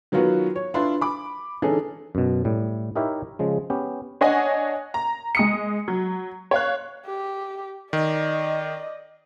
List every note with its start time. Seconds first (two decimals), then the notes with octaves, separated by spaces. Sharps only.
0.12 D#3 F#3 B3 F4 F#4 B4
0.56 C#5
0.74 D4 E4 F4 B4 B5 C6
1.01 B5 D6
1.62 D3 E3 C#4 D#4 G#4 A4
2.15 F#2 B2
2.45 A2 G3
2.96 D#4 E4 G4 A#4 C#5 E5
3.39 C#3 F3 G#3
3.70 B3 C#4 G4
4.21 D4 C#5 D#5 F#5 G#5
4.94 A#5
5.35 G#3 D#6 C#7
5.88 F#3
6.51 C#5 F5 F#6
7.06 G4
7.93 D#3 D5 D#5